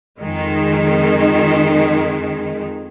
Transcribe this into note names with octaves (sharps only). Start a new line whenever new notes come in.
F2 D#3 G#3